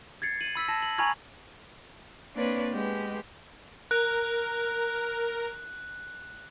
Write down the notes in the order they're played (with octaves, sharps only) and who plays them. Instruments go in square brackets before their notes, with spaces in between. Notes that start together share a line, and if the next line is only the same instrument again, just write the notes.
[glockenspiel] G#6 A6 C7 C#7
D#7 F#7
B5 E6 B6
A5 A#6
F#7
G#5 A#5 B5 C#6 F6 G#6
[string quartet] A#3 C4 D4 B4 C#5
G#3 B3 G4
[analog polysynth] A#4 [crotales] F#6